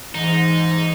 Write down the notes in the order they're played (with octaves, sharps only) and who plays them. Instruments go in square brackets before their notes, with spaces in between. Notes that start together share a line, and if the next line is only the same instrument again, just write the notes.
[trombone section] G#2 [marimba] E3 [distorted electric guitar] D#4